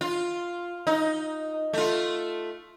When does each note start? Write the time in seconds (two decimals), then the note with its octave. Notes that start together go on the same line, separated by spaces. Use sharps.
0.01 F4
0.87 D#4
1.73 A3 F4